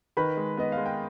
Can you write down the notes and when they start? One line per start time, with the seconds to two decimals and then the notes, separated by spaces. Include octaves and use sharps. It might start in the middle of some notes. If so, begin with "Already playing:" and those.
0.17 D#3 B4 B5
0.37 G#3
0.57 B3 D#5
0.72 G#3 F5
0.86 G5